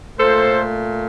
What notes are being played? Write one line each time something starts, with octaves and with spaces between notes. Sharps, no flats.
A#2 A3 A4 C5